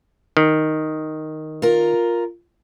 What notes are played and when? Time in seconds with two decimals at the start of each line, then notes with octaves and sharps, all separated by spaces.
0.37 D#3
1.62 F4 A#4